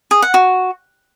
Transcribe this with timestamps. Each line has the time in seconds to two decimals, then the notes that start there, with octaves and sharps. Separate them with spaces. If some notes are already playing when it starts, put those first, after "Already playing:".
0.11 G#4
0.22 F#5
0.34 F#4